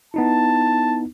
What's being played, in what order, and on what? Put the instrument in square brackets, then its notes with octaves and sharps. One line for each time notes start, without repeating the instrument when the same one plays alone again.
[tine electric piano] B3 D#4 E4 [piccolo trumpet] A5